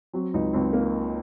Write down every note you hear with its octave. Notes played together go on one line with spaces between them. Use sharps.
F#3 C4
C#2 D#4
C#2 C4
A#3